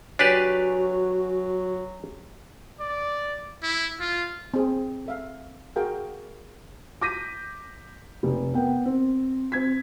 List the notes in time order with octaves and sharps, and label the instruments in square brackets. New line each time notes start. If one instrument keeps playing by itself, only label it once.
[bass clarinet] F#3 [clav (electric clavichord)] D4 G4 B4 [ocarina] F#4 [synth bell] C#5 G#5 F7
[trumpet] D5
[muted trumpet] E4
F4
[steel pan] C4 G#4
A4 E5 F5
F#4 G#4 A#4 F5 G5
[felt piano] D6 G6 A#6 B6 D#7
F1
B3 A#4 G5
C4
C4 G#6 B6